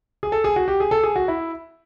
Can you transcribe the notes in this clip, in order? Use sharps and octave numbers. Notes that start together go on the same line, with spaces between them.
G#4
A4
G#4
F#4
G4
G#4
A4
G#4
F#4
E4